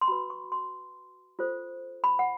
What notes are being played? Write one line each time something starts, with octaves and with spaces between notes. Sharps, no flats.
C6
F#4 B4 B5
C#6
C6
F4 A4 C5
B5
F#5